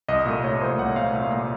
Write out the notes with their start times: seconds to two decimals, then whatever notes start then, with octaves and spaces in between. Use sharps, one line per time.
0.08 C2 D#5
0.26 A#2 A3
0.44 C2 C#5
0.61 A#2 A3 C5
0.78 C2 F#5
0.96 A#2 A3 F5
1.13 C2
1.31 A#2 A3